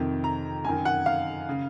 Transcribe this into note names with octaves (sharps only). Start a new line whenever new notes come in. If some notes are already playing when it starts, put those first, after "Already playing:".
Already playing: F2 C3 D#3
A#5
F#2 D#3 G#5
F#5
F5
C#3